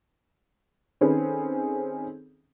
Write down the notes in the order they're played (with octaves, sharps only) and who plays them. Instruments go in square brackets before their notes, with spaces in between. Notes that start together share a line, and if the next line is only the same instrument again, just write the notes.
[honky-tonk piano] D#3 C4 C#4 G#4 A4 B4